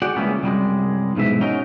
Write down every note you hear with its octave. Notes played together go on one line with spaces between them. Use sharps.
F#4 G#4 D5 F#5 G5
C#2 E3 G3 A#3 B3 C#4
C2 F#2 G3 G#3
B1 G#2 E3 E5
C#4 D#4 F#4 A#4